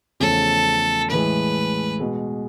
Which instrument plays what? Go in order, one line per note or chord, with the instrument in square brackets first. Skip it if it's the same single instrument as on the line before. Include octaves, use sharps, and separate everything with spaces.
[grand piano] E2 C#3 F3 A3 C#4 [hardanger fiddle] A4
[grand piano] A2 E3 G#3 [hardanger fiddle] B4
[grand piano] B2 G#3